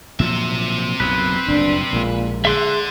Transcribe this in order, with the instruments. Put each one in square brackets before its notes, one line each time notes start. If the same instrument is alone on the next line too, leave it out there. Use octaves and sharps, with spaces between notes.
[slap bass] A#2 F3 F#3 [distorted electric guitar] C4 E5
[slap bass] B1 F#2 A#2 [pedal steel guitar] B4
[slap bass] F#1 D2 G2 [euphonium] D4
[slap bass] A#1 G#3 [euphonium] A#2
[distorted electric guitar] D3 [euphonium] G#4 [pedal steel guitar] E5 C6 F#6